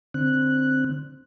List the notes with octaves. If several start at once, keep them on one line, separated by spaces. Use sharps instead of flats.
D3 C4 F#6